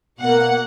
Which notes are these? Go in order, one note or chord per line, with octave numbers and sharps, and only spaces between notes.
B2 A#3 F#5